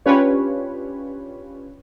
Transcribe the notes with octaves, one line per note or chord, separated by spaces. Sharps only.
C#4 D4 F4 G4 B4 C#5